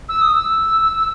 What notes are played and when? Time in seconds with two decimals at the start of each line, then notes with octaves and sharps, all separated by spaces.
0.09 E6
0.22 D#6
0.35 E6